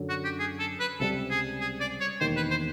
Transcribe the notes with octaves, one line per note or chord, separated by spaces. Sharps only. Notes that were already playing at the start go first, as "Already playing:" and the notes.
Already playing: F#2 D3 F#3
F#4
G4
G#4
A4
B4
C#2 C3 E3 G3 A4
G#4
G#4
D5
C#5
E1 D#2 D#3 C5
B4
C5